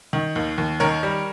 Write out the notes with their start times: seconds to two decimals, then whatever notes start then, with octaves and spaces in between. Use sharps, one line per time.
0.13 D#3
0.36 D#2
0.58 D#2
0.80 D#3 A#4 C#5
1.03 G3